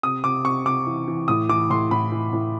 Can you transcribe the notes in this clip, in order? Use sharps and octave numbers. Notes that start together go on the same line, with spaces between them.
C3 D#6
C3 D6
C3 C#6
C3 D6
E3
E3
A2 D#6
E3 D6
A2 C6
A2 B5
E3
A2